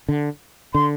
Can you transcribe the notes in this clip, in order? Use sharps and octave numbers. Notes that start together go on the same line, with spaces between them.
D3
D3 C6